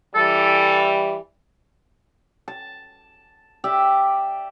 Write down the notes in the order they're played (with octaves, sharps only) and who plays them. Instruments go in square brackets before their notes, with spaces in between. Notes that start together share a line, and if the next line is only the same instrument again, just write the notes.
[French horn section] E3 G3 [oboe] A4
[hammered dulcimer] A5
G4 D5 E5